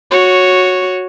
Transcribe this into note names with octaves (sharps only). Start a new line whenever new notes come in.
F#4 C#5